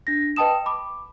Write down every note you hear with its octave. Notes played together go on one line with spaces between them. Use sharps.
D4 A#6
B4 D#5 G5 A5 D#6 E7
B5 D6